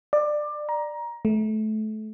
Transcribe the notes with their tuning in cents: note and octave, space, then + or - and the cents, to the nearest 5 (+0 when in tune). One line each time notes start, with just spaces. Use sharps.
D5 +20
A#5 +20
A3 -25